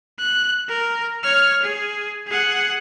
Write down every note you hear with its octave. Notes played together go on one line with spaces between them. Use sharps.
F#6
A#4
C#5 F6
G#4
G#4 F#5